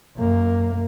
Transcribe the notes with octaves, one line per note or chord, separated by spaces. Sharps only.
F#2 A#3